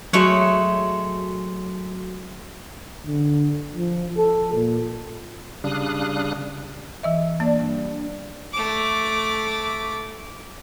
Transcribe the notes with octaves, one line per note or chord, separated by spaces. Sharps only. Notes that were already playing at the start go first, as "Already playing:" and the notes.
F#3 G#3 A3 F#4 C#5
D3
F3
A4
A#2
C#3 G3 D4 F5 D#6 F#6
E3 D#5 E5
A#3 D4
G2
A3 D6